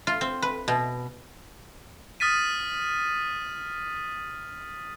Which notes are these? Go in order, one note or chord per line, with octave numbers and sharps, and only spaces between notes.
F4
C4
B4
B2
D#6 F6 A6 B6 D#7